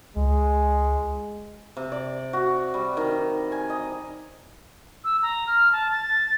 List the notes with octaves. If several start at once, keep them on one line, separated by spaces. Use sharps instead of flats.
C#2 G#3
C3
D5
F#4
G3
D#3
G#5
D#5
E6
A#5
F6
A5
A6